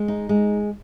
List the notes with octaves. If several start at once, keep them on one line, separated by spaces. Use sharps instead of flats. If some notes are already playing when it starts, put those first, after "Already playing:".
Already playing: G#3
D#4
G#3